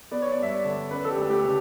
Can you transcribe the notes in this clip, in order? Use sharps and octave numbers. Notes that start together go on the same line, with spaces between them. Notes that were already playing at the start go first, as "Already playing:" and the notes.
B3 D5
C#5
D5
G2 E5
D5
D3
C#4 B4
A4
G4
D2
G4
C#3